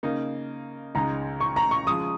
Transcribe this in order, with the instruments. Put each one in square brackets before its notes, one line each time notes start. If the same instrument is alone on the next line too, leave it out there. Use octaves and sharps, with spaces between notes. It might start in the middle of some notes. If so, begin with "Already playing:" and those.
[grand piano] C#3 A#3 D#4
[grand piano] C#2 C#3 G#3 D#4 [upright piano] A#5
[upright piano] C#6
A#5
C#6
[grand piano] C#3 F3 G#3 F4 [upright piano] D#6